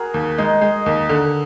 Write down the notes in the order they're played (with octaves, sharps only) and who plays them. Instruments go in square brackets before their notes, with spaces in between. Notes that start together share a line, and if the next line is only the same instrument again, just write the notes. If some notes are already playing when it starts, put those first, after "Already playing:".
Already playing: [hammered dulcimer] F#4 G#4 A#4
[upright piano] D#2
[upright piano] G#3 [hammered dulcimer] D#4
[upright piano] G#3
D#2
D3